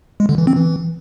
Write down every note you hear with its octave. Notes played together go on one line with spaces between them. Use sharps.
G#3
D3
E3
C4
E3